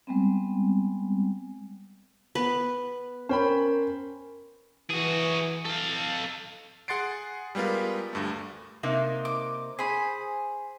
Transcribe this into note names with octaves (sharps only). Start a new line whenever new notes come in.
G3 G#3 B3 C4
B3 B4
C#4 A#4 C5 G5 B5
E3 F#4 G#4
A4 F5
G#4 F#5 C6 A6 C7 D7
G3 G#3 B3 F4 A#4
D2 G2 A3
C3 A#3 D#4
D6
G#4 C5 B5